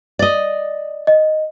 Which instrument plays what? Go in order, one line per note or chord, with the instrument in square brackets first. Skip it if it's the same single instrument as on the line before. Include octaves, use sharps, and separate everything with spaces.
[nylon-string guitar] D5 D#5
[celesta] D#5